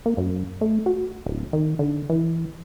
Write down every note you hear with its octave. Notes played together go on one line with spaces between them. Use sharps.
A#3
F#2
A3
F#4
D1
D#3
D3
E3